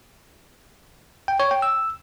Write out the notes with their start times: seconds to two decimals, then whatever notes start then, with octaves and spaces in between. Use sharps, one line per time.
1.28 G5
1.40 C#5
1.51 G5
1.62 E6